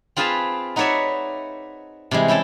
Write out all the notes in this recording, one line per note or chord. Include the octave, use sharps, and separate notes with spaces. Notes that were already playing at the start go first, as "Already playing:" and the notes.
C4 F4 G#4 B4 F5 A5
D#4 F#4 B4 C#5 D5 E5
C3 E3 G3 G#3
C#4 E4 G5 A5